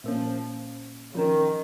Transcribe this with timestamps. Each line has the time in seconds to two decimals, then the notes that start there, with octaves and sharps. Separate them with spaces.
0.04 A#2 F3 A#3 C#4
1.11 C#3
1.15 D#3 F3 C#4 A#4